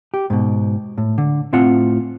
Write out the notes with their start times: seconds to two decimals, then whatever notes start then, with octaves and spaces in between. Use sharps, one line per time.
0.14 G4
0.30 G#2 B2
0.98 A2
1.18 D3
1.53 A2 C4 F4 F#5